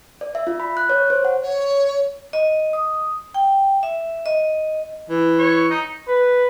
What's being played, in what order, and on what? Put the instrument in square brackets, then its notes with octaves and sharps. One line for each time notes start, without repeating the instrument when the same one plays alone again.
[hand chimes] D5
E5
F4
B5
F#6
C#5
C5
F#5
[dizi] C#5
[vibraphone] D#5
D#6
G5
E5
D#5
[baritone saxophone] E3
[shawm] C#5
D#4
[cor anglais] B4